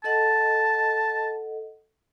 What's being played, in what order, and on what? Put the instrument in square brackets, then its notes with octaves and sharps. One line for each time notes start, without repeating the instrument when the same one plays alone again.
[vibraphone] A4 D#5 F#5 [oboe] A5